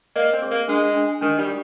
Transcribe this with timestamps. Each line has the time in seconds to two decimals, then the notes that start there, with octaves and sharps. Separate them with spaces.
0.16 A#3 D#5
0.33 C4
0.42 G#4
0.51 A#3
0.68 G#3 D4
0.95 D4
1.21 D#3 D4
1.39 G3
1.48 G4